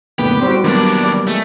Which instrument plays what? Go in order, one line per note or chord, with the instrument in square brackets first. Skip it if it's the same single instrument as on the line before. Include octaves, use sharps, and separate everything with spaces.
[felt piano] F#1 D2 A#2 [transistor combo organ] B3 [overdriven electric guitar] G4
[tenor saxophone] G3 [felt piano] B3 F#4 [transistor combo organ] C4
[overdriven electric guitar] D#2 D4 [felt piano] F#3 A#3 B3 [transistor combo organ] D6
[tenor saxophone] G3
[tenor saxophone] G#3 [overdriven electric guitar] A3